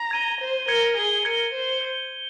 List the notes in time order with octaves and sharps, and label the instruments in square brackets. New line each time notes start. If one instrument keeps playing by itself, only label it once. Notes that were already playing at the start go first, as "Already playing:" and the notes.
Already playing: [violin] A#5
[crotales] G#6 D#7 G7
[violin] C5
[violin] A#4 [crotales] G#6 C#7 G7
[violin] G#4
[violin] A#4 [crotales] G#6 C#7 G7
[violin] C5
[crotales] G6 C#7 G7